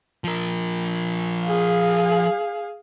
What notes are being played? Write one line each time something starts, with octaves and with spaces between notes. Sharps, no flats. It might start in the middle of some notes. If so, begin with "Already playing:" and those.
F3 A#4
G#4 F5